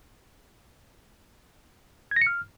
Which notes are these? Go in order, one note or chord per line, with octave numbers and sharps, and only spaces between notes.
G#6
A#6
C#7
F6